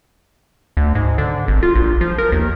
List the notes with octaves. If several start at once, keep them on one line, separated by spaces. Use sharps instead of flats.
D2
G#2
D3
G#1
F4
A#1
F3
A#4
D#2